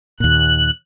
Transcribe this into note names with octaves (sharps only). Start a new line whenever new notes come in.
D#2 A#2 F#6